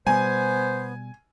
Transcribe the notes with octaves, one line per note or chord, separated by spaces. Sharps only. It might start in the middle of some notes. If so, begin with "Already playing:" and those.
B2 G3 B3 C5 G#5